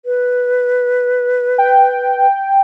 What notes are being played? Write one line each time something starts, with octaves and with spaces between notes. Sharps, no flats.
B4
G5